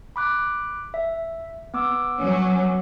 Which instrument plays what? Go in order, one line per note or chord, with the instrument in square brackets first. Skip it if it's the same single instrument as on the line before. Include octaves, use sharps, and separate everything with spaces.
[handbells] B5 D6 F#6
E5
B3 D6 E6
[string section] F#3 C#4